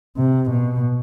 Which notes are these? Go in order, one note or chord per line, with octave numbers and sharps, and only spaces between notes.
C3
B2